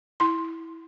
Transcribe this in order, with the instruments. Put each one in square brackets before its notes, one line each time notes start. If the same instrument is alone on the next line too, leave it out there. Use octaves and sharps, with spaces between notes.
[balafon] E4 C6